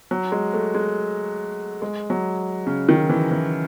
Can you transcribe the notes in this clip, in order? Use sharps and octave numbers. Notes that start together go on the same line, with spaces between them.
F#3
G#3
A3
G#3
G#3
F#3
C#3
D#3
E3
E3